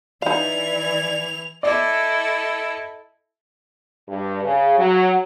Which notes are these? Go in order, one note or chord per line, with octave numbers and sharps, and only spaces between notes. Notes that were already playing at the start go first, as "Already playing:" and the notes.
E3 D#4 D5 F5 G#6 F7
E4 A4 D5 D#5
G2
C#3
F#3